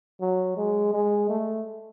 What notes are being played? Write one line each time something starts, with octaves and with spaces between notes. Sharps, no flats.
F#3
G#3
G#3
A3